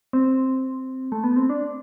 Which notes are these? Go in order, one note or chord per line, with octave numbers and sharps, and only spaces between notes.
C4
A3
B3
C4
D4